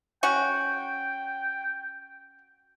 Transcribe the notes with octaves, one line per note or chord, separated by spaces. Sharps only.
C#4 F#4 G5